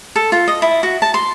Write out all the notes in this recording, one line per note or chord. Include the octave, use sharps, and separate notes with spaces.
A4
F4
D#5
E4
F#4
A5
C6